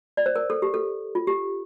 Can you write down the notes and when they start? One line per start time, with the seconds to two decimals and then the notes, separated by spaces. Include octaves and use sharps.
0.17 D5
0.26 C5
0.36 A#4
0.50 A4
0.62 G4
0.74 A4
1.15 F4
1.27 G4